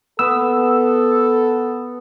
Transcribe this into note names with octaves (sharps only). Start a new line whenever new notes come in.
B3 A4 E6